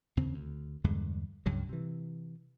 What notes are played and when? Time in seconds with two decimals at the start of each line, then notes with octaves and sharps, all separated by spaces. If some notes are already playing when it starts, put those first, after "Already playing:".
0.17 D#2 C#3 C4
0.34 D2
0.84 E2 G2 D3 G#3
1.46 C#2 G2 C#3 F#3
1.69 C3 E3